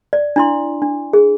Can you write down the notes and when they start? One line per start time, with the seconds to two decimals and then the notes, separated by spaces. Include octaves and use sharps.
0.13 D5
0.36 D4 E4 C6
0.82 D4
1.13 G#4